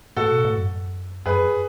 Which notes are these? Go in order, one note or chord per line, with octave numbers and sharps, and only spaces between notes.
A2 F#4 A4
B2
A2
F#2
F#2 G#4 B4